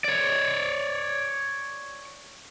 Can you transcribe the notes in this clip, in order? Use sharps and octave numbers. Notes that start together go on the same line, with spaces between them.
C#5 D5